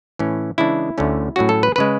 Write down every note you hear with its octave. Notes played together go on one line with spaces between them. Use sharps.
A2 E3 A3 C#4
C#3 E3 G#3 D4 E4
D2 D3 A3 C#4
A2 F#3 C#4 F#4
A4
B4
C#3 G#3 B4